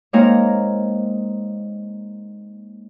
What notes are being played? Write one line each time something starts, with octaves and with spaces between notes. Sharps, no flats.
G#3 A#3 C4 D#4 A#4 C#5